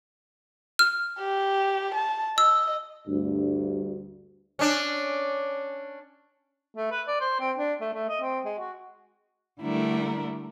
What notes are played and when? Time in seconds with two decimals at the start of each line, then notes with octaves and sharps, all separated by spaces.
0.79 F6
1.20 G4
1.95 A5
2.38 D#5 E6
3.08 D2 G2
4.59 C#4 D4
6.76 A3
6.91 B4
7.08 D5
7.21 C5
7.40 C4
7.57 D4
7.81 A3
7.93 A3
8.09 D#5
8.21 C4
8.45 G#3
8.59 F#4
9.61 D3 G3 A3 D4 E4 A#4